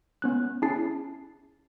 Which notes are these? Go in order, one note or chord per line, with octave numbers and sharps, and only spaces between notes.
B3 C#4 F#6
C#4 E4 G#4 A5 A6 C7